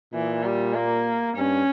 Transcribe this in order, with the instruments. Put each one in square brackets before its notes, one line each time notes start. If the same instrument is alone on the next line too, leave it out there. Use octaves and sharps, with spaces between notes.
[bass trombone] A#2 [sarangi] E3
[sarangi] G3
A#3
[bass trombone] G2 [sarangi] C#4